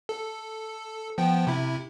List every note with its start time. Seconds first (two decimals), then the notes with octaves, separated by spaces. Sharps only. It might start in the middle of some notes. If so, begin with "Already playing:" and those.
0.09 A4
1.18 F3 B3 G5
1.47 C3 E4